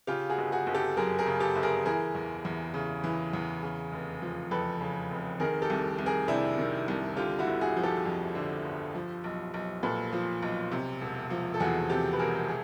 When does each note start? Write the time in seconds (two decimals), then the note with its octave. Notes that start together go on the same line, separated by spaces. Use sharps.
0.07 C#3 F4 G4
0.30 F#4 G#4
0.38 G1
0.52 F#4 G#4
0.67 G1
0.74 G4 A4
0.97 F#2 G#4 A#4
1.18 G#4 A#4
1.26 C#3
1.40 G4 A4
1.55 G1
1.63 G#4 A#4
1.85 E3 G#4 A#4
2.15 E2
2.45 E2
2.74 C#3
3.04 E3
3.33 E2
3.62 C#3
3.92 F1
4.22 F3
4.51 F2 A4 B4
4.81 C#3
5.11 F1
5.40 D#3 G#4 A#4
5.62 G4 A4
5.70 C2
5.99 C2
6.06 G#4 A#4
6.28 C3 D4 E4
6.58 D#3
6.88 C2
7.16 D3 F4 G4
7.39 E4 F#4
7.47 G1
7.61 F#4 G#4
7.77 F3
7.83 G4 A4
8.06 F2
8.35 D3
8.65 G1
8.95 F3
9.24 B1
9.54 B1
9.83 A#2 A4 B4
10.12 F3
10.42 B1
10.72 C3
11.01 E1
11.30 F3
11.54 A4
11.60 E2 F#4 G#4
11.90 C3 G4 A4
12.13 B4
12.19 E1 G#4 A#4
12.48 G#4